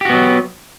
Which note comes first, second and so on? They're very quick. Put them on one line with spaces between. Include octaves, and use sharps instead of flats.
G4 F#4 B3 F#3